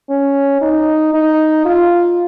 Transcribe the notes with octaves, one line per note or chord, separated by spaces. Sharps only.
C#4
D#4
D#4
F4